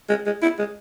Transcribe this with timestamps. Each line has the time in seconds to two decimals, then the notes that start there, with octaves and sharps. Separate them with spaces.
0.09 G#3
0.26 G#3
0.42 E4
0.59 G#3